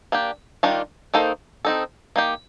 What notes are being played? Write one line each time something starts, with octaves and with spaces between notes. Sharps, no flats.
A#3 D4 G4
D#3 G3 D4 F4
D#3 A#3 D#4 A4 C5
C4 D#4 A4
A#3 D#4 G4